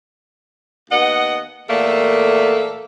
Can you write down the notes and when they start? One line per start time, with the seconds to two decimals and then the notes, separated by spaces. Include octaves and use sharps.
0.91 D#2 B3 D#5 F#5
1.69 E2 A#2 A3 A#3 A4